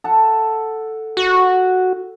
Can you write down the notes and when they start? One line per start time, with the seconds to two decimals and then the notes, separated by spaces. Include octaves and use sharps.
0.04 A4 F#5
1.17 F#4